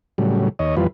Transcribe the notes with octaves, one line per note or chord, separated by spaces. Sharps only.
A2 C#3 F#3 G3
D#2 C#5 D#5
F2 E3 G3 F4 B4